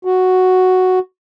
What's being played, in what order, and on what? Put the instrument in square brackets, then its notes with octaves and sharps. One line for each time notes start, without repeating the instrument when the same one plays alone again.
[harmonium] F#4